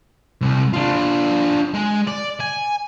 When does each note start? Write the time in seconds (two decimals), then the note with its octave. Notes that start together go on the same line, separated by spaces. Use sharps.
0.41 C2
0.73 D4 F4
1.74 G#3
2.08 D5
2.40 G#5